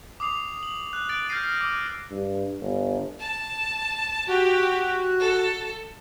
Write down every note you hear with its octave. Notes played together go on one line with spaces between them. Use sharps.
D6 D#6 C7 F7
F#7
F#6
F#6 A6 D7 F#7
F6 G6 A6 A#6 C7 D#7
D6 E6
G2
G1
A5
F#4 G4
A4